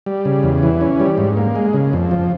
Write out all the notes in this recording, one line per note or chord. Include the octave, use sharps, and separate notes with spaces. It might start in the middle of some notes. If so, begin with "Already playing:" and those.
G3
C#3
E2
E3
C#4
G3
G#2
A#3
G#3
C#3
F2
F3